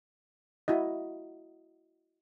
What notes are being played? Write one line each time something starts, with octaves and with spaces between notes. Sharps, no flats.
E4 F#4 D#5